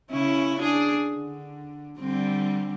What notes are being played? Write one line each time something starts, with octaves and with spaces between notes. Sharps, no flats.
C#3 C#4 E4
D4 G#4
D3
D3 G3 C4